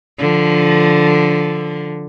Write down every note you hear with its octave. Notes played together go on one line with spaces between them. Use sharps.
D3 F3